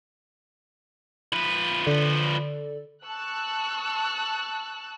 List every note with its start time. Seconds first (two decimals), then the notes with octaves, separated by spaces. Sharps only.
1.32 F3 B4
1.87 D3 A4 D5
3.06 A5 C#6 E6 F#6